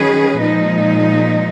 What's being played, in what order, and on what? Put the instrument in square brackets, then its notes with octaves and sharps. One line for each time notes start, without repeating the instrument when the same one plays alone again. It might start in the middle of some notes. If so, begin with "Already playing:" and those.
Already playing: [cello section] D#3 F#3 C#4 G#4 B4
A#2 F3 G#3 D#4